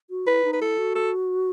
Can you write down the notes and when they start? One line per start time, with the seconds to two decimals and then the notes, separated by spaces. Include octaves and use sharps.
0.10 F#4
0.27 E4 B4
0.44 D#4
0.53 B4
0.61 E4 A4
0.78 F#4
0.95 A4